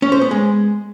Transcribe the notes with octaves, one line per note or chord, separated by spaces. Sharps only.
C#4
C5
B3
G#3